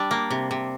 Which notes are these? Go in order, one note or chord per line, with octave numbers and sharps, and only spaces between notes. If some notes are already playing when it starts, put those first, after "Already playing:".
Already playing: G3 D4
A#3
C3
C3